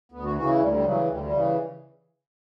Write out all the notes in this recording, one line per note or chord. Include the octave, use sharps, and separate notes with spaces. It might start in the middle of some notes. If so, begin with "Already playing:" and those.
D2 B3
F#4
C#3 E3 F#4
E4
D2 G3
G3
C#3 E3 F#3
D2 G3
G3
C#3 E3